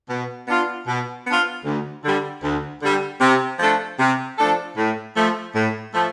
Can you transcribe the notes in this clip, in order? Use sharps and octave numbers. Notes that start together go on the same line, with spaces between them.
B2
B3 D4 F4
B2
B3 D4 F4
D2
D3 G3
D2
D3 G3
C3
F3 A3 D4 A4
C3
F3 A3 D4 A4
A2
F3 A3
A2
F3 A3